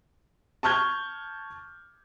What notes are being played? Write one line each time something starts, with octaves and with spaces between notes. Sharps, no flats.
A5 C#6 F6 G6 G#6